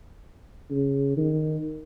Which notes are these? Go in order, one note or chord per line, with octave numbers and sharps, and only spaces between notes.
C#3
D#3